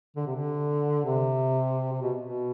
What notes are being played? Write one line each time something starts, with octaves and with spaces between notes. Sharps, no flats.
D3
C3
D3
C3
C3
B2
B2